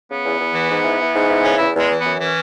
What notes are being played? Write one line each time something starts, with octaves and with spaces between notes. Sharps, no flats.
C#3 B3
E2
E2
E3
G#2
E3
E3
G#2
E3
C#3 C#4
E2 E4
E2 G#3
E3
F#2 B3
E3 C#4